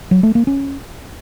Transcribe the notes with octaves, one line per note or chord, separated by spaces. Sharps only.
F#3
A3
A#3
C#4